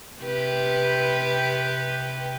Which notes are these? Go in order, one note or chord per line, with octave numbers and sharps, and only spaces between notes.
C3 G4 B4